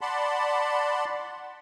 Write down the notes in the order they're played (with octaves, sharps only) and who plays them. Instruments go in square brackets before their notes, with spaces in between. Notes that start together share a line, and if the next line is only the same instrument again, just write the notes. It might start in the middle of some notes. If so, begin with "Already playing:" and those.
[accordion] D5 F#5 A5 B5 C6